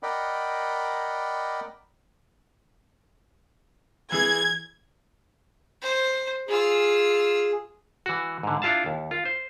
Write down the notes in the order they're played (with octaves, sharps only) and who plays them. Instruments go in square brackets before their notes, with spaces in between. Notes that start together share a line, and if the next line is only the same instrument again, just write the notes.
[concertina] A#4 D5 D#5 F#5 G5 B5
[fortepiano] E3 G#4 [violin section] G#6
[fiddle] C5
[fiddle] F4 E6 [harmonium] G#4
[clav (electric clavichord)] E3 F#4
G#2 D3
D4 E4 F4 F5 A5
D#2
F4
C5